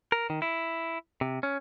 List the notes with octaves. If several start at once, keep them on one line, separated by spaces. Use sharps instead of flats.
A#4
D#3
E4
C3
C#4